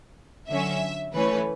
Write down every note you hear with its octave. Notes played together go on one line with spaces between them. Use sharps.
D3 F#3 C#4 E5
E3 A3 C#4 B4